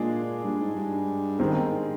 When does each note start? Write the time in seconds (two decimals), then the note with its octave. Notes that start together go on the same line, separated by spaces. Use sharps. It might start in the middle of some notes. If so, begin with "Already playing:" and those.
Already playing: A#2 G#3 D4 G#4
0.44 G2
0.60 G#2
0.76 G2
1.39 D#3 G#3 C4